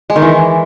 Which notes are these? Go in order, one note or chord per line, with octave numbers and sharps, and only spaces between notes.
G#3
D#3
E3